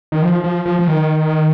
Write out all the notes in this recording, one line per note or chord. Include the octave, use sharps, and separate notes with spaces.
D#3
F3
F3
F3
F3
D#3